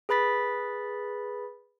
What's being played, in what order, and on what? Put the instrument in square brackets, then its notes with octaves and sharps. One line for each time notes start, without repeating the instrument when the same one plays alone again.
[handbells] G#4 B4 B5 A6 B6